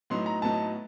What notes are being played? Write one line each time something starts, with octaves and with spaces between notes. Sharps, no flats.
A2 F#3 B3 D#4 C6
A#5
A2 F#3 B3 D#4 A5